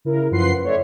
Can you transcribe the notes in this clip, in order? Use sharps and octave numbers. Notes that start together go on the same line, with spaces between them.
C#3 E4 A#4
F#2 F3 B4 F#5 C6 C7
A3 C#5 D5 E5